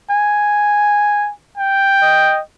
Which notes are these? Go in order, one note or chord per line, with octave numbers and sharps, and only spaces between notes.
G#5
G5
D#5